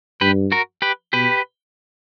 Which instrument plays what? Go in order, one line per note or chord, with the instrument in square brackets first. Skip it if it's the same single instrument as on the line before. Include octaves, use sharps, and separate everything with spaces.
[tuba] G2 [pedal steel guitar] G4 B4
[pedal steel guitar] F#4 A#4
G4 B4
[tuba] B2 [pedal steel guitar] G4 B4